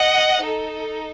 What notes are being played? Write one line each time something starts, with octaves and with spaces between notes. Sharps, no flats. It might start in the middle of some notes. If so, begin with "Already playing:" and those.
Already playing: D#5 F#5
D#4 A4